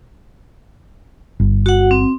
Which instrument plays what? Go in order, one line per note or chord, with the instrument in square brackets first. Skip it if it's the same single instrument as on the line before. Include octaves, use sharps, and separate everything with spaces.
[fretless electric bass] G1
[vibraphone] F#4 F#5
C4